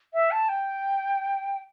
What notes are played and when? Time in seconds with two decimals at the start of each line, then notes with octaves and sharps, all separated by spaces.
0.13 E5
0.31 A5
0.49 G5